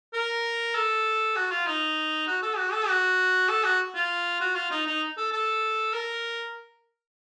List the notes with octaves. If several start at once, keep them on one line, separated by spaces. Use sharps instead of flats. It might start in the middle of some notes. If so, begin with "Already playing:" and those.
A#4
A4
F#4
F4
D#4
F#4
A4
F#4
A4
F#4
A4
F#4
F4
F#4
F4
D#4
D#4
A4
A4
A#4